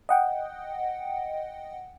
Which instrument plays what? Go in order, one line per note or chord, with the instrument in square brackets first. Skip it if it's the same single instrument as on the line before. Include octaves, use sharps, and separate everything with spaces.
[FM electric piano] D#5 F#5 G5